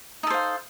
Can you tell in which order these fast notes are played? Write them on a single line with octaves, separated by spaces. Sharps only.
D#4 A4 C5 F5